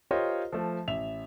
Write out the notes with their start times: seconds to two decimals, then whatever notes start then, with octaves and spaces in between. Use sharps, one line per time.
0.11 F4 G4 A#4 C5 C#5 D#5
0.52 F3 A3
0.87 A1 E5 F7